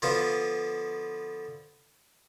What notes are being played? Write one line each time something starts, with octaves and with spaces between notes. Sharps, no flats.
D3 F3 B3 F4